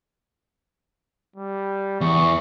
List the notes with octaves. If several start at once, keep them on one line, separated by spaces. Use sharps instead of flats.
G3
E2 C#6